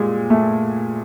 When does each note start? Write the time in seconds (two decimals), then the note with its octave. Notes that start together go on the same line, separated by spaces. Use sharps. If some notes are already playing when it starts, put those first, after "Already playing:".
Already playing: A#2 G3 G#3
0.30 A3